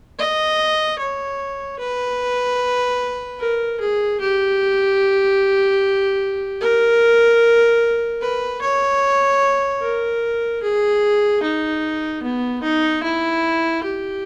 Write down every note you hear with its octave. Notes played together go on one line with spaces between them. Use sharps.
D#5
C#5
B4
A#4
G#4
G4
A#4
B4
C#5
A#4
G#4
D#4
B3
D#4
E4
G4